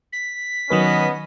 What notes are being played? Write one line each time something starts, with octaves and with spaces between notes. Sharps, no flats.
B6
D#3 F#3 B3 C#4 B4 D#5